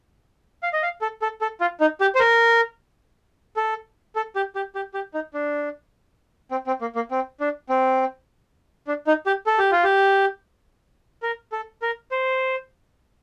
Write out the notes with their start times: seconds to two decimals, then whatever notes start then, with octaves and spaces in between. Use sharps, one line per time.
0.63 F5
0.73 D#5
0.83 F5
1.01 A4
1.22 A4
1.41 A4
1.60 F4
1.80 D#4
2.01 G4
2.15 C5
2.20 A#4
3.56 A4
4.16 A4
4.36 G4
4.56 G4
4.75 G4
4.94 G4
5.14 D#4
5.34 D4
6.51 C4
6.67 C4
6.81 A#3
6.96 A#3
7.11 C4
7.40 D4
7.69 C4
8.87 D4
9.07 D#4
9.26 G4
9.46 A4
9.58 G4
9.71 F4
9.84 G4
11.23 A#4
11.52 A4
11.82 A#4
12.11 C5